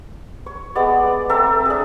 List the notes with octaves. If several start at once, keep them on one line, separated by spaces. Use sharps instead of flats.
C#5
G#3 B3 D5
C4 A4 E5 A#5
D4 G#4